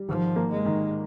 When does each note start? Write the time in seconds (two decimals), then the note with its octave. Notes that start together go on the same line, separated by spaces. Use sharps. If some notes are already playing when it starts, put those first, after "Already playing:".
Already playing: G3
0.08 G#1 F3
0.36 A#3
0.51 G#3
0.65 D#3